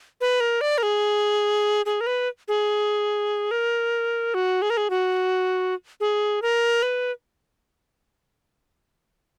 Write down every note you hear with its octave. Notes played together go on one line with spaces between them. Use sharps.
B4
A#4
D5
A#4
G#4
G#4
A#4
B4
G#4
A#4
F#4
G#4
A#4
G#4
F#4
G#4
A#4
B4